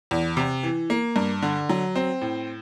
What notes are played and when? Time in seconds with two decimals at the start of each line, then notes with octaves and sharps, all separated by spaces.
0.11 E2
0.37 C3
0.63 E3
0.90 A#3
1.16 G2
1.42 D3
1.69 F#3
1.96 C4
2.21 A2